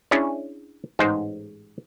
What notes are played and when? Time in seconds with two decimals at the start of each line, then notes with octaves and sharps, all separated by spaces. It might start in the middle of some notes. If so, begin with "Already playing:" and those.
0.11 C#4 D4 E4 G#4 C#5
0.99 A1 G#2 G#3 D#4 C5